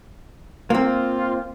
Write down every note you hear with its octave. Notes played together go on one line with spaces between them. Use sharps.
A#3 C4 F4